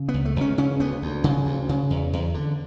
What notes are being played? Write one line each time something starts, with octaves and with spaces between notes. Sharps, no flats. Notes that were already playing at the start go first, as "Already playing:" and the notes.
Already playing: C#3
B3
C#2
A3
C#2 C#4
C#3 C#4
D2 B3
D2
C#3
D2
C#3
E2
E2
D3